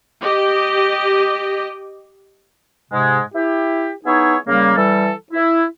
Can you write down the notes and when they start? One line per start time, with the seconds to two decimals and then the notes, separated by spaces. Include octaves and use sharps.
0.21 G4 D#5
2.92 G#2 C3 G#3
3.34 E4 G4
4.06 B3 D#4 E4 G#4 C#5
4.47 C#3 G3 A#3
4.76 E3 G3 A4
5.33 E4